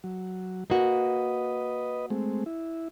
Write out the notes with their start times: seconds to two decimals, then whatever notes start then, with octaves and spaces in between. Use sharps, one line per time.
0.04 F#3
0.70 A#3 F#4 B4 D#5
2.10 G#3 A3 C4
2.46 E4